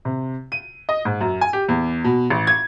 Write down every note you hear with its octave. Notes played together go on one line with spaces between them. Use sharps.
C3
D#7
D#5
G#2
F#2
G#5
G4
E2
B2
A1
G#6